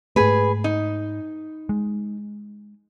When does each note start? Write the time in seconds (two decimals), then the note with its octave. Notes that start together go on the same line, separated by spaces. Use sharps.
0.16 G#2 A3 G#4 B4
0.64 D#4
1.69 G#3